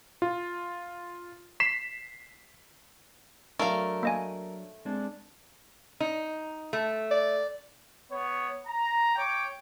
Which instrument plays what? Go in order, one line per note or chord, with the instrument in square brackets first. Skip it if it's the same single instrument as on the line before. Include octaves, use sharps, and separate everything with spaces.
[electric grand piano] F4
B6 C7 E7
[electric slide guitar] F#3 D4 [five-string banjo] A3 F5 [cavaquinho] A#4
[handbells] A#3 D#5 G#5
[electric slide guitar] G#3 C4 D4
[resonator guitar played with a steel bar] D#4
A3
[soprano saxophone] D5
[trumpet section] B3 C#5
A#5
C#5 G5 D6